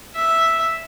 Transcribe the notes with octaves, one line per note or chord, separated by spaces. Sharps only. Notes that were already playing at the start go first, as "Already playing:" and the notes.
E5